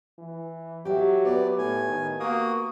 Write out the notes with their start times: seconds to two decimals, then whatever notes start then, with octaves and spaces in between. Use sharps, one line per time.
0.19 E3
0.85 F#3 G4 E5
1.25 B3 D5
1.58 A2 G#5
1.88 D#3
2.20 A#3 F#4 D#6